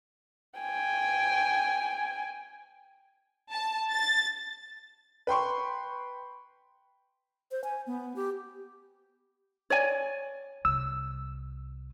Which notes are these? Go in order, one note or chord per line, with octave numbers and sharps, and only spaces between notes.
G5 G#5
A5
A6
B4 G5 C6 C#6
C5
G#5
B3
G4
C#5 D5 G#5
C2 E6